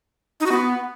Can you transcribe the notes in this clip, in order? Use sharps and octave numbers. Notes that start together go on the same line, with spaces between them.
D#4
F#4
B3